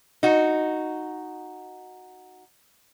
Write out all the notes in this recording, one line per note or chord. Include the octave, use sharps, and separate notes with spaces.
D#4 F#4